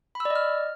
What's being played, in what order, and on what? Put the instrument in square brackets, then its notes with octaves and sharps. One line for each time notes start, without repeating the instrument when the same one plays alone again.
[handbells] B5
E6
D5
D#5
F6